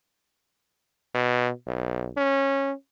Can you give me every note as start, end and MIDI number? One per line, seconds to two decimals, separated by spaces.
1.15 1.51 47
1.67 2.10 35
2.17 2.72 61